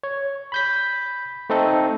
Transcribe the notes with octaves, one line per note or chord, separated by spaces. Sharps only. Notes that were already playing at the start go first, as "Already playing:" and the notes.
C#5
B5 G6 B6
A3 C4 D#4 A4